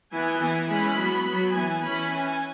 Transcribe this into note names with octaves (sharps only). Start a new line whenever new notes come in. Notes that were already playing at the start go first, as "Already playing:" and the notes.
E3 B3 G#5
E3 B3 G#5
E3 G#3 C#4 B5
F#3 B3
F#3 B3
E3 B3 G#5
E3 C#4 B5
E3 C#4 G#5